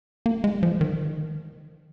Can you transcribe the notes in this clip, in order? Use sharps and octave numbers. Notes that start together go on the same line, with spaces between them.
A#3
G#3
F3
D#3